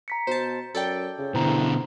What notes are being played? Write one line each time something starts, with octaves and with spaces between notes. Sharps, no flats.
A#5 B6 C#7
B2 C5 A5
F#2 A4 D5 G5
C#3
B2 D3 E3 C5 A#5